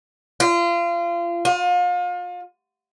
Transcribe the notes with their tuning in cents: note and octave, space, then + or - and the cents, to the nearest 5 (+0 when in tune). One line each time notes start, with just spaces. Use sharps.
F4 -30
F4 +35